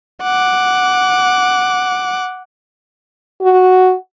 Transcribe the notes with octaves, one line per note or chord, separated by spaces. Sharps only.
F#5 D6
F#4